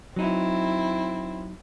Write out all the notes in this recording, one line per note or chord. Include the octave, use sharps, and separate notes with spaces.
F#3 C4 D#4 E4